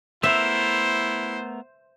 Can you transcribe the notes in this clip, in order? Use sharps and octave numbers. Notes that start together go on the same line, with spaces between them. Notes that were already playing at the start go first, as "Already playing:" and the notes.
A3 B3 E4 A#4 C5 E5